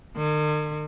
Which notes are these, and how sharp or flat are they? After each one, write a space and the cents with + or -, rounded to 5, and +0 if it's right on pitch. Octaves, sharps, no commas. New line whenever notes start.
D#3 -45